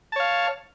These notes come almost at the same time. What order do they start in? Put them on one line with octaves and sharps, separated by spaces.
A5 C#5 F5